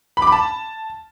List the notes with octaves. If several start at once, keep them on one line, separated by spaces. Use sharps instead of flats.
B5
D6
B5
A5